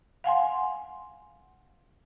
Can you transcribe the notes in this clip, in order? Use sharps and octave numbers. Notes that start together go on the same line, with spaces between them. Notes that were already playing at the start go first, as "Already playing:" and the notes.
F5 F#5 G#5 C6